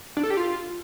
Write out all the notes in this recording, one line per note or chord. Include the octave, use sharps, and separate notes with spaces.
D4
A4
G4
F4